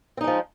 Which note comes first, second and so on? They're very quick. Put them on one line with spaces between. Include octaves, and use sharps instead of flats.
C4 D#4 G#3 F3